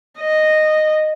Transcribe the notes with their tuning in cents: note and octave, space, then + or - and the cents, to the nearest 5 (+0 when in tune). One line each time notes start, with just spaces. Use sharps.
D#5 -10